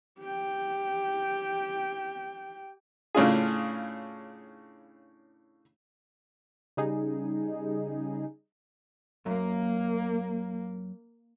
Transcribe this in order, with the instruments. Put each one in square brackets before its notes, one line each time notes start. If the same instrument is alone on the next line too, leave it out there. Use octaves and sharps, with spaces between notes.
[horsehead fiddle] G4 G5
[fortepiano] A2 C#3 D4 F4 G#4
[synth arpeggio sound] C#3 G3 D#4 G#4
[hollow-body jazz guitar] F#2 [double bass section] A#3